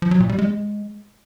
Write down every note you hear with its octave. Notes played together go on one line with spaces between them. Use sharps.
F3
F#3
A#2
G3
G#3